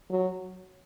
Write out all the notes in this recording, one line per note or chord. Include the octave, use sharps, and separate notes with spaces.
F#3